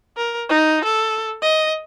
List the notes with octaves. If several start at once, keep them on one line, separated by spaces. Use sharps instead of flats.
A#4
D#4
A4
D#5